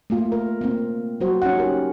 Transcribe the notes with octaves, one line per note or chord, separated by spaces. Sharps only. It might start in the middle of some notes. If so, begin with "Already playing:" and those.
A3 A#3 F4
A#4
A#3 C4
F#3 G3 F#4 C5
C#4 D#4 F#5
G4 A#4